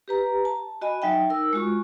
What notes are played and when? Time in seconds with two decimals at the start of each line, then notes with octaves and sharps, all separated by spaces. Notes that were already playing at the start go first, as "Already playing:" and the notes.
0.08 G4 B4 A#5
0.45 A5
0.81 F#4 D#5 G#5 B5
1.02 F#3 D#4 E5 G5
1.30 D#4 A#4 E6
1.53 G#3 F4 F#4 C#6